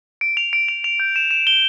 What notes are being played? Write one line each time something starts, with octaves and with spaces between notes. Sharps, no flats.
D7
F7
D7
F7
F7
G6
E7
E7
G7